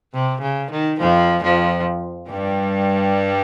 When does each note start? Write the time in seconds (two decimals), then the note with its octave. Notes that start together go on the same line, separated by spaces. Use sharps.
0.14 C3
0.42 C#3
0.71 D#3
1.00 F2 F3
1.43 F2 F3
2.29 G2 G3